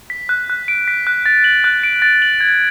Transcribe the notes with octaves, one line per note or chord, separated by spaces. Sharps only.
B6
F#6
F#6
D7
B6
F#6
A6
F#7
F#6
D7
A6
F#7
G#6